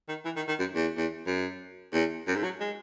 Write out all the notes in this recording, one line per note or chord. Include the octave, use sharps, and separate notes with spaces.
D#3
E3
D#3
D#3
F#2
E2
E2
F#2
E2
F#2
G#2
F#3
G#3